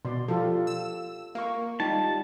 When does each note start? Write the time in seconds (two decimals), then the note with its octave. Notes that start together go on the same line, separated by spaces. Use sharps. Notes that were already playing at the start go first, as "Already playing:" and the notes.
0.05 B2 D5 C6
0.28 F3 F4 G4 A4
0.67 E6
1.35 A#3 F5 C#6
1.80 G3 D#4 F4 G5 A5